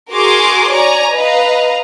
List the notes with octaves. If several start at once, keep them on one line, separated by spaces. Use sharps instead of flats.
F#4 G#4 A#4 G#5 C6 D6
C#5 D5 G#5 A#5
B4 D#5 F5 A#5